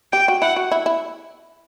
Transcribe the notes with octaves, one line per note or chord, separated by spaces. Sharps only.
G4 G5
F#4
E4 F#5
F#4
E4
E4